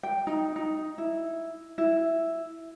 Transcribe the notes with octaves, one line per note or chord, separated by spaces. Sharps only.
G5
D#4
D#4
E4
E4